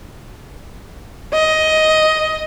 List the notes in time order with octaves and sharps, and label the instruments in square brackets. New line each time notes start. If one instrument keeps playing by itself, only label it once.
[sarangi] D#5